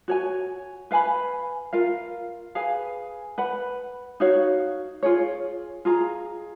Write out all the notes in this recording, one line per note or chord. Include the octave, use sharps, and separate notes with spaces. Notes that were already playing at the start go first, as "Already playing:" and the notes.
F#4 C#5 G#5
B4 F5 G#5 B5
F4 A#4 F5
G#4 B4 F5 G#5
B4 F#5 B5
D#4 F#4 C#5 F5
F4 G#4 C#5
F4 G#4 D#5 A#5